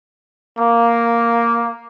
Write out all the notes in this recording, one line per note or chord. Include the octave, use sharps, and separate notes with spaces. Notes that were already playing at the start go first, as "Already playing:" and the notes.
A#3